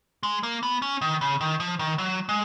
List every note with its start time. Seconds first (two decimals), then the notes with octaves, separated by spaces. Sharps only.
0.23 G#3
0.43 A#3
0.63 B3
0.82 C#4
1.01 D#3
1.21 C#3
1.41 D#3
1.60 F3
1.79 D#3
1.98 F#3
2.29 G#3